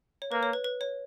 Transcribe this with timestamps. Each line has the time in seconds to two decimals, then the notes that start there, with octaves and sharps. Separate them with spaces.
0.22 C#5
0.32 A#3 B4
0.43 C#5
0.53 B4
0.64 B4
0.81 C#5